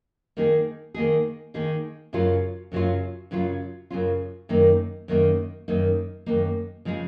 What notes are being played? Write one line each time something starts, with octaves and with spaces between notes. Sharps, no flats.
D#3 A#3 D#4 G#4
D#3 A#3 D#4 G#4
D#3 A#3 D#4 G#4
F#2 C#3 F#3 C#4 F4
F#2 C#3 F#3 C#4 F4
F#2 C#3 F#3 C#4 F4
F#2 C#3 F#3 C#4 F4
F#2 D#3 A#3 D#4
F#2 D#3 A#3 D#4
F#2 D#3 A#3 D#4
F#2 D#3 A#3 D#4
C#3 F3 G#3 D#4 G#4